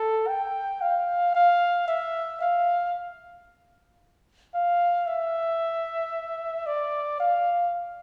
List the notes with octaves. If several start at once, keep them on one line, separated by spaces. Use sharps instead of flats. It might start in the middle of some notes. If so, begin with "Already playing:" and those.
Already playing: A4
G5
F5
F5
E5
F5
F5
E5
D5
F5